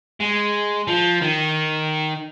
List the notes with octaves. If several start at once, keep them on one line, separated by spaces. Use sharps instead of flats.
G#3
F3
D#3